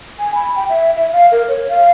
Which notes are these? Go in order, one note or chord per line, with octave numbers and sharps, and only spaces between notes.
G#5
B5
G5
E5
E5
F5
A#4
C#5
F5